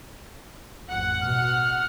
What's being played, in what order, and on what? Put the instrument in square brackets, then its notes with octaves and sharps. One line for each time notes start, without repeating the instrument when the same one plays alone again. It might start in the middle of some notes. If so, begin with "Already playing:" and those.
[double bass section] A1 F2 [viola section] F#5
[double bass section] B2 [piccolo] F6